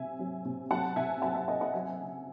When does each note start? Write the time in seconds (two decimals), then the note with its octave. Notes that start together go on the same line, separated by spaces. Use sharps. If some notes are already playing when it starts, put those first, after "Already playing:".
Already playing: C3 F#3 E5 G#5
0.19 F#3
0.45 C3
0.70 F#3 F#5 A5
0.96 C3 E5 G#5
1.22 F#3 F#5 A5
1.35 E5 G#5
1.48 C3 D#5 F#5
1.61 D#5 F#5
1.74 F#3 E5 G#5
1.99 C#3